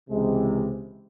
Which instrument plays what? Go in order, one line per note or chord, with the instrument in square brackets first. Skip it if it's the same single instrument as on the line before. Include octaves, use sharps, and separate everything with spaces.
[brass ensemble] C#2 C3 E3 G#3